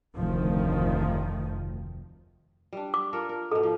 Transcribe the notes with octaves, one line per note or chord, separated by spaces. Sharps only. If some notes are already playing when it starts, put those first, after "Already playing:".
F1 D2 D#3 F3
G3 D4
D6
F4 A4 A#4
A#4
G#2 B2 A4
F3